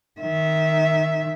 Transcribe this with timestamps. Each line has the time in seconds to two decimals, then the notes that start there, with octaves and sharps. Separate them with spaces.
0.21 D#3 E5